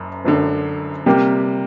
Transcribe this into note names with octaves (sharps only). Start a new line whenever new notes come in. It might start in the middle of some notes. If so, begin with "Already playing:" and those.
Already playing: F#1 F#2
F#1 F#2 D3
C3 G3 A#3